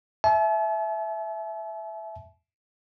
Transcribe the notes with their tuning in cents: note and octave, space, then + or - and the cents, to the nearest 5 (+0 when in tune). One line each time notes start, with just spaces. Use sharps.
E5 +0 A5 -45